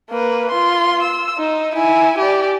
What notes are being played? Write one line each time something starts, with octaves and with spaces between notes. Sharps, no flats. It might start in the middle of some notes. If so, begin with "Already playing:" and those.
A#3 B4
F4 C6
E6
D#4
E4 G#5
G4 D5